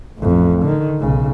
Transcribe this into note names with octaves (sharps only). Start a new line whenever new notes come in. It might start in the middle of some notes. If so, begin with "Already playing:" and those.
A1 F2
D3 D#3
B1 C#3